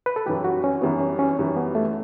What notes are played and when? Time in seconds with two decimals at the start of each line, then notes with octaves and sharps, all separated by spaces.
0.06 B4
0.16 A4
0.26 F#2 E3 G3 G4
0.44 F#4
0.64 C#4
0.82 F#2 E3 G3 B3
1.00 C#4
1.19 C#4
1.38 F#2 E3 G3
1.56 B3
1.75 A3